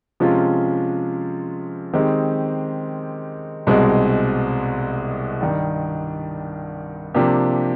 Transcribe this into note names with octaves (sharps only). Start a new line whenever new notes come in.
C3 F3 G#3 C#4 F4
D#3 G#3 C4 D#4 G4
C2 B2 G#3 C4
G2 D#3 G3
C3 F3 A#3 D4 G4